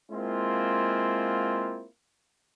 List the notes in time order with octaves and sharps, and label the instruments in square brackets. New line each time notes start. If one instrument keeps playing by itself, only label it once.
[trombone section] G#3 A#3 C4 E4 F4